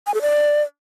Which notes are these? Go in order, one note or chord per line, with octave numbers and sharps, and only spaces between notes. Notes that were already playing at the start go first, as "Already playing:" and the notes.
G#5
A4
D5